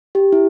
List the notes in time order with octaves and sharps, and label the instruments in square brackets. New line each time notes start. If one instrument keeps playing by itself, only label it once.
[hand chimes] G4
E4